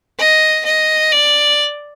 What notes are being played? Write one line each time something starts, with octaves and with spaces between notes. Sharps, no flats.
D#5
D#5
D5